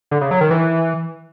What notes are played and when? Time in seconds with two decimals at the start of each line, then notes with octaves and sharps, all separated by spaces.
0.11 D3
0.21 C#3
0.31 F#3
0.41 D#3
0.51 E3